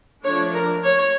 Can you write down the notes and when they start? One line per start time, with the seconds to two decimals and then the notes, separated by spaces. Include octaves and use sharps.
0.24 F3 A3 D4 C#5
0.54 A#4
0.84 C#5